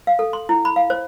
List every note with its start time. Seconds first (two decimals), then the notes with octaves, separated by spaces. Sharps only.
0.07 F5
0.19 A4
0.33 C6
0.49 E4
0.65 B5
0.76 F5
0.90 C5